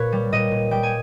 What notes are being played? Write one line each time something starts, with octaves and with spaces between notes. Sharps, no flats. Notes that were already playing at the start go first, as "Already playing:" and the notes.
Already playing: A#2 B4 C#5
G3
A#2 D#5
A#2
G3 G5
G#5